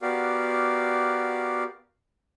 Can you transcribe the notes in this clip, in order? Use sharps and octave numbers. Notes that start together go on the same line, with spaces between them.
B3 F#4 G4 A#4 D5 F5